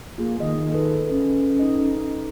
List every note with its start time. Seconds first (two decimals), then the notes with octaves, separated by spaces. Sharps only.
0.18 A#3 F4 G#4
0.40 D#3 D#5
0.72 A4 B4
1.10 C#4
1.59 D#4 A4 D#5